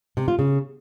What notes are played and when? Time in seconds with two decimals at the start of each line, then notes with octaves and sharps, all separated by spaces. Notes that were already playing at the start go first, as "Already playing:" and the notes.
0.17 C3
0.28 F4
0.39 C#3